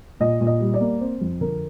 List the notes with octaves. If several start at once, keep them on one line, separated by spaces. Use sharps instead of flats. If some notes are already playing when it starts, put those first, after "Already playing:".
A#2 D#5
A#2
D#5
G3
D5
A#3
C4 C5
F2
D3 A#4